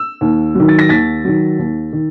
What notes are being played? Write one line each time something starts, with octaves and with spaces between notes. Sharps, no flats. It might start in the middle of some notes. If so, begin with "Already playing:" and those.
Already playing: E6
D#2
D#3 F#3
A6
A#6
D#2 A6 B6
D#3 F#3
D#2
D#3